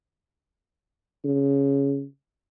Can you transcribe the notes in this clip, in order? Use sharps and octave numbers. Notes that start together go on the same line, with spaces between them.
C#3